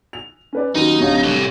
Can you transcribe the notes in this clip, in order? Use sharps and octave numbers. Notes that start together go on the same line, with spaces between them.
F7
C#4 B4 D5
D#2 F#3 A#3 C#4 D#4
D1 C3 C#5 F5
C2 A2